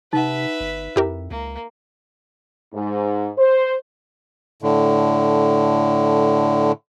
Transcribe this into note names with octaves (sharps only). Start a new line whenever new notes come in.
C3 D#4 B4 E5 F#5
G1
F2 E4 G4 A#4
C#2 A#3
G#2
C5
A2 D3